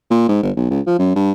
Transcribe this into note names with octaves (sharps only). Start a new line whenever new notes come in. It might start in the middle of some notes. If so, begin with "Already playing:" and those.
A#2
G#2
G1
B1
C#2
F3
F#2
G2